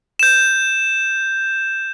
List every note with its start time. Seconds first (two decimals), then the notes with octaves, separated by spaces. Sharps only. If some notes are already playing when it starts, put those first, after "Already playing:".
0.19 G6 E7